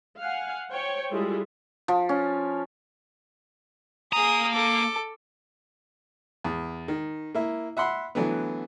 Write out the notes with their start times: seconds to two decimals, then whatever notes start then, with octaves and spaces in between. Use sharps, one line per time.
0.19 F5 F#5 G#5
0.70 C5 C#5 G5
1.11 G3 G#3 E4 F4 G#4 A4
1.88 F3
2.09 C#4
4.13 A#3 G#4 A#5 D#6
4.53 A4 D6
6.44 E2
6.88 D#3
7.35 A#3 E4
7.77 E5 F#5 B5 C6
8.15 D3 E3 F#3 A3 B3